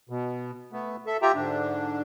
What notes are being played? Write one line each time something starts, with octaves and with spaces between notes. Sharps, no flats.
B2
A3 B3
A4 E5
F4 G4 E5 G5 A#5
G#2 D3 D4